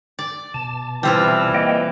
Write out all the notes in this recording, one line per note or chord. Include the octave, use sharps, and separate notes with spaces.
D5
B2 A5
E3 G3 C4 F4
A#3 D#5 G5